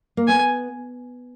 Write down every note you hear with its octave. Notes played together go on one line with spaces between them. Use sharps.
A#3
B3 G#5